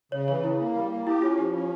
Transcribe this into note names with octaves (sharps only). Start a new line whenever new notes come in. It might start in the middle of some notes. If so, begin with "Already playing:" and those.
C#3 C#5
E3 C#5
C#3 E4
A#3
G3
A#3
E4 G4
C#4 F4
F3 G4
C#4 F4